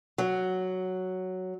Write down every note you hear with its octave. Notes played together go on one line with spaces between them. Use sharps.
F#3